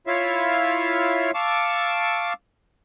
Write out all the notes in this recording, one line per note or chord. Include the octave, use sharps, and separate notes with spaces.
E4 F4 C#5 E5 F5
F5 A5 C#6 D6 E6